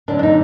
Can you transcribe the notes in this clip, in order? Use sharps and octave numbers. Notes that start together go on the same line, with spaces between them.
F#2 D3 D4
D4
D#4